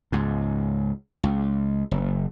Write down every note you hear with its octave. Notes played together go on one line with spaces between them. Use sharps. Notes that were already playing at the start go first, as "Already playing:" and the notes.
C#2 G#2
C#2
F#1